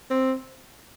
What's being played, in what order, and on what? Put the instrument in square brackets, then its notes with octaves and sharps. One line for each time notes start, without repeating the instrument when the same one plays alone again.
[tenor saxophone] C4